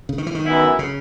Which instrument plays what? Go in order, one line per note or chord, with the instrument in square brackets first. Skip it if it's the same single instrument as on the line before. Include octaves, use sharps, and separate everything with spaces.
[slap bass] C#3
D#3
E3
D#3
[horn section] F#2 E3 B3 E4
[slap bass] C#3